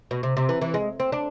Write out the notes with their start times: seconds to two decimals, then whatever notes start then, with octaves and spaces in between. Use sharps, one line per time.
0.11 B2
0.23 C3
0.37 C3
0.49 E3
0.61 E3
0.74 G#3
1.00 C4
1.12 D4